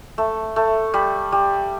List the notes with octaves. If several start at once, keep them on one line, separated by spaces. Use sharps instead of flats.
A3
A3
G3
G3